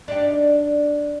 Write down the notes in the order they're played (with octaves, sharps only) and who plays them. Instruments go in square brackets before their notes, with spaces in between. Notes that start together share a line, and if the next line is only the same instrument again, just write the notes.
[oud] D4 D#4 G4